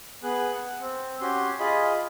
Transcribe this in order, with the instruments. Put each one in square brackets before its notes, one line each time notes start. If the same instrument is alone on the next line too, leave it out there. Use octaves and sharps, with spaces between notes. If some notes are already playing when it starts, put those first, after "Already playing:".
[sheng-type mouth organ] B3 G#4 F#6
F#5
C4
C#4 F#4 G4 C6
F4 G#4 D#5 B5